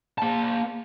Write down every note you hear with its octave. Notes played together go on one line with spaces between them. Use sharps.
A#3 A5